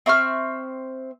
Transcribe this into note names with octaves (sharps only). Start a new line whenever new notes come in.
C4 E5 C#6 F6